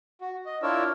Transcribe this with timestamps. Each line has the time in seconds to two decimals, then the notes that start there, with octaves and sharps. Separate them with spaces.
0.21 F#4
0.46 D#5
0.63 D4 E4 F4 A#4 C#5 E6